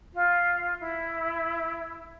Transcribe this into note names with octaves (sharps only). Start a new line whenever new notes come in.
F4
E4